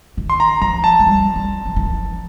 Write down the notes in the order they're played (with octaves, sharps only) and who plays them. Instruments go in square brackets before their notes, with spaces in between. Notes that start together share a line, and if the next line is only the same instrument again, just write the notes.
[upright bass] D#3
[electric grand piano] C6
A#5
[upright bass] F3 [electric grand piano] A#5
[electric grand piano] A5
[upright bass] A3
G3
G3
F3
D#3
F3